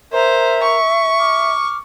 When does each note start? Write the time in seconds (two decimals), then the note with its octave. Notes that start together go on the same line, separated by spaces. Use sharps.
0.13 A#4 C5 E5 A#5
0.63 C#6
1.19 D6 F6